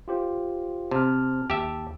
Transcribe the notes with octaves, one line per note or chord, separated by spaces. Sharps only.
F4 G4 C5
C3 A5 F6
D#2 G4 E5 A5